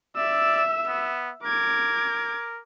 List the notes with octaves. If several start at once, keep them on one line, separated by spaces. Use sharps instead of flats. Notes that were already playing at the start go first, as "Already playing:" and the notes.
D5 E5 E6
B3
A#4 D6 G#6